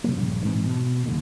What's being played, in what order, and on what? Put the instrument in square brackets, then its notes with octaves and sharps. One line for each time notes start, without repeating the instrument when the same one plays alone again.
[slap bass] C3 F#3 A#3
A#1 G2 C#3
G#2 E3 C4
B2
F#1 D#2 D3